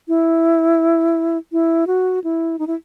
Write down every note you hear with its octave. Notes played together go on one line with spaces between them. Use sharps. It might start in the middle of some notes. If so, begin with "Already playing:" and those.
E4
E4
F#4
E4
D#4
E4